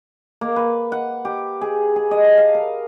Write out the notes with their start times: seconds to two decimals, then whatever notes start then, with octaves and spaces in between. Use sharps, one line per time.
0.41 A#3
0.56 B4
0.92 F#5
1.25 G4
1.61 G#4
1.96 G#4
2.11 D#5
2.24 A5
2.38 F5
2.55 A#4